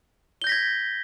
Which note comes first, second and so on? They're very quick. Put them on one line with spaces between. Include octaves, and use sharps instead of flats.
G7 G6 A#6 B6 G#6